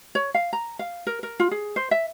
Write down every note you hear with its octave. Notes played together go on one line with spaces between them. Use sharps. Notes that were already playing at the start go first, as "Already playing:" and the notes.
C#5
F5
A#5
F5
A#4
A#4
F4
G#4
C5
E5